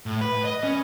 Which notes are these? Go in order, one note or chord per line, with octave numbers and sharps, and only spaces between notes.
A2
B4
D#5
C#4